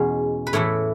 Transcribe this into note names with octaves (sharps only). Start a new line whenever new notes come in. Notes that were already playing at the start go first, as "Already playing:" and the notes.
Already playing: E2 B2 G#3 C#4
B4
A2 E3 A3 E4 C#5